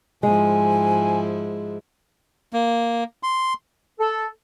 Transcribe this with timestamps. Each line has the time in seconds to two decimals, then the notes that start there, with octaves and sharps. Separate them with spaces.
0.23 G#2 F3 G#3 E4 G#5
2.53 A#3
3.23 C6
4.00 A4